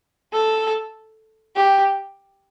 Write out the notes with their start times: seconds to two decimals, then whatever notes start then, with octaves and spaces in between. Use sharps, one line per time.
0.33 A4
1.56 G4